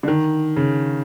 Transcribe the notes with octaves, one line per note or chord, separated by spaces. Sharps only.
D3
D#3
C#3